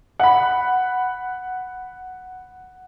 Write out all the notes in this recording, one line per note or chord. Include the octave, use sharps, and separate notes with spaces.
F#5 B5